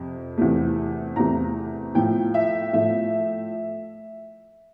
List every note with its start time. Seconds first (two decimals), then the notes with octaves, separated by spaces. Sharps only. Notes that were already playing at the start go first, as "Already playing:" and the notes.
Already playing: F2 C3
0.38 E2 C3 E3 A3
1.16 E2 C3 E3 A3 A#5
1.94 A2 F3 A3 G5
2.34 E5
2.73 A2 F3 A3 E5